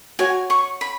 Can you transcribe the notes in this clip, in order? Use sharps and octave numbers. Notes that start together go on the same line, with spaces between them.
F#4 C#5 F#5 G#5
C#6
B5